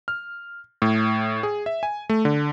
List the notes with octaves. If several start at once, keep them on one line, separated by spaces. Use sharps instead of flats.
F6
A2
G#4
E5
G#5
A3
D3